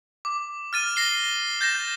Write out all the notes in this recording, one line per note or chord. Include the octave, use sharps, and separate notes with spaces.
D6
F6 A6 D#7
A#6 C7 G7
G6 A6 A#6 E7